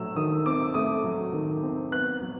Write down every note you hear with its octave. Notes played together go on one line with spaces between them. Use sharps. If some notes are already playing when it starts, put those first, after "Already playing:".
Already playing: F#3 A3 E6
D#3 D#6
C4 D6
A3 D#6
F#3
D#3
C4
B3 F#6
F#3